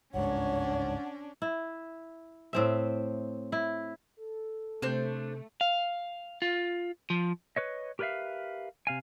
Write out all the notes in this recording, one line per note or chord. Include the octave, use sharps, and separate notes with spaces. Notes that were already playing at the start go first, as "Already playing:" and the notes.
G1 C#2 G#2 C#4 D4 C#5 F#5
E4
A2 C4 E5
E4
A4
C3 A3 D4 C5 G6
F5
F4
F3
B4 C#5 D#5
G4 A#4 B4 C#5 E5 F5
C3 F5 G#5